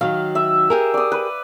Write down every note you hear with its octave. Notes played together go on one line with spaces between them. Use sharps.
D#3 F#3 F5
E5
G4 G#4 A#4
D5 D#6
B4